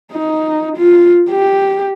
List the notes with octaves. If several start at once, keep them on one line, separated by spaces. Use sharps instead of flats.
D#4
F4
G4